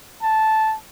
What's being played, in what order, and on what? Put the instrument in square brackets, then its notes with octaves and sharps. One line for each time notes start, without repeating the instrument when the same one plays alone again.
[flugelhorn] A5